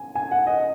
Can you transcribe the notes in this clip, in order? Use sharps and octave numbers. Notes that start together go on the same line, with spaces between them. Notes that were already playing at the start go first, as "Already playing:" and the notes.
Already playing: G#5
G#5
F#5
D#5